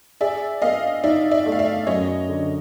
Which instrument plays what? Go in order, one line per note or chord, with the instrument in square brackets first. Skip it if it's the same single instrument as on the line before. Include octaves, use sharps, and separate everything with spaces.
[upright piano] G#4 [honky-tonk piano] D5 E5
[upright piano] A#3 [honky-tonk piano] D#5 F5
[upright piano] D#4 [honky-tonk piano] D5 E5
[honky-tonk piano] D5 E5
[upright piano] A3
[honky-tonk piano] F5
D5 E5
[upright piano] F#2 [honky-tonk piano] C#5 D#5
[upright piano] D3